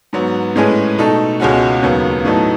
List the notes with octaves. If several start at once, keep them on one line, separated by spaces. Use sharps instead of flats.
G#2 F#3 B3
A2 G#3 C#4 G#4 B4
B2 A3 D#4 A4
C#2 B2 G#3 C#4 F#4
D#2 C#3 F#3 B3
A2 F#3 B3 D#4 A4